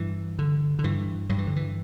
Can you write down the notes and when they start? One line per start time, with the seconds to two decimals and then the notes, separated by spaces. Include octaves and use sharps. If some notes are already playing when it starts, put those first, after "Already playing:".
Already playing: G2 E3
0.39 D3
0.79 D3
0.84 G2 E3
1.29 G2 F#3
1.38 E3
1.47 D3
1.56 E3